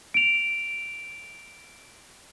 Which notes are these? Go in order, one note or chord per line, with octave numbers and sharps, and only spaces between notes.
D7 F7